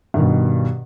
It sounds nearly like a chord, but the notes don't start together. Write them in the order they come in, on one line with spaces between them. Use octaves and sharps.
G2 D#3 B2